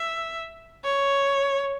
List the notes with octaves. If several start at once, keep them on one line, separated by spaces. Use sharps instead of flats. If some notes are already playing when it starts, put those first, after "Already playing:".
Already playing: E5
C#5